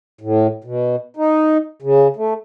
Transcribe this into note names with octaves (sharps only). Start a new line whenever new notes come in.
A2
B2
D#4
C#3
A3